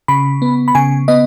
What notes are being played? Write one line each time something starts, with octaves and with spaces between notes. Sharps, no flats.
C#3 B5
B3
B5
C#3 G#5
B3 D#5